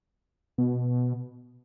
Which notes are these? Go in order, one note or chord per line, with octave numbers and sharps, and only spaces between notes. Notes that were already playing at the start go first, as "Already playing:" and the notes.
B2